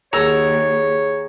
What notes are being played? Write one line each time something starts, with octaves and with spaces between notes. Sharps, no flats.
D#2 G#4 A#4 C#5 F#5 A#5 E6